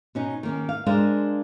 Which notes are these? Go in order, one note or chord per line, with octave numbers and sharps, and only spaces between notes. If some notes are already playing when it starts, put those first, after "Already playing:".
B2 C#4 D#4
D#3 A#3 C#4
F5
G#3 D4 A#4 C5 F5